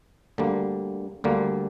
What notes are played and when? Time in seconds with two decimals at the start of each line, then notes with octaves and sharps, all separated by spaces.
0.38 D2 D3 G3 A#3
1.24 D2 D3 G3 A#3